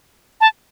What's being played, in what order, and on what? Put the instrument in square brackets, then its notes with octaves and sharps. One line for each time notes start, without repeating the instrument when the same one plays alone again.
[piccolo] A5